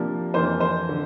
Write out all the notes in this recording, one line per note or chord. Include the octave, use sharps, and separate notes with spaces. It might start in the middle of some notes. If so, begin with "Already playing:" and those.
Already playing: C3 F3 A#3 D4
F2 E3 A#3 D4 C5
C5
D3